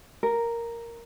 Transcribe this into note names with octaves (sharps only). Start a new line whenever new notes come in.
A#4